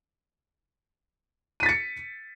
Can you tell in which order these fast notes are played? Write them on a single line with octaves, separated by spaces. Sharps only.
D#7 B6 A6 C#7